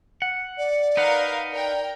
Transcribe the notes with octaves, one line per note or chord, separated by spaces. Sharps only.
F#5
D5
D#4 A#4 B4 F5 F#5
A#4 D5 G5